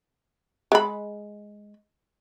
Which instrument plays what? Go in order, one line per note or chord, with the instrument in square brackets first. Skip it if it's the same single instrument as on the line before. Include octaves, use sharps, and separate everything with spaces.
[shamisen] G#3 B5